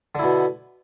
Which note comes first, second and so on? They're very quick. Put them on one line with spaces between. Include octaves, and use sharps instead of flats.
D3 E4 B2